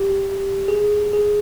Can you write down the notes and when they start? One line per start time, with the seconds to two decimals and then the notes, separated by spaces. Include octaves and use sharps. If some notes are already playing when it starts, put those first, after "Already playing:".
Already playing: G4
0.68 G#4
1.13 G#4